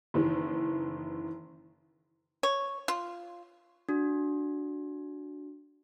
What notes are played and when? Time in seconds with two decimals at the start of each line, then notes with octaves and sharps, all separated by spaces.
0.14 F#1 D#3 E3
2.43 C#5
2.88 F4
3.89 D4 F#4